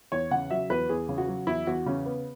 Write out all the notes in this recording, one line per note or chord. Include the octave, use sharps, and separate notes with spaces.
E2 C#5
C#3 F#5
F#3 E5
E2 B4
E2 G#4
C#3
F#4
F#3
E2 E4
E2 F#4
C#3 C#4
B3